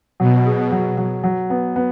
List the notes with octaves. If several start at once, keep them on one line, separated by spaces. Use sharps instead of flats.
B2 F#3
G#4
F#3
F#3
F#3
B3
B3